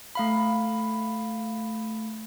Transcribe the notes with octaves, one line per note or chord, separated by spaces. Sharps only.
A3 F5 B5